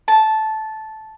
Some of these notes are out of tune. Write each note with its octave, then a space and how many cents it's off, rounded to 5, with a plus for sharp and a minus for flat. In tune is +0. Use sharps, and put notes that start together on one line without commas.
A5 -10